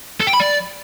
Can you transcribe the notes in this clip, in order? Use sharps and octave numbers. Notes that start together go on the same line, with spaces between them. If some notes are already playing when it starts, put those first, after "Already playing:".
A4
G5
B5
D5